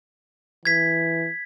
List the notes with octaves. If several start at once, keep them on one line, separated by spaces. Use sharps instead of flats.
E3 G#6 B6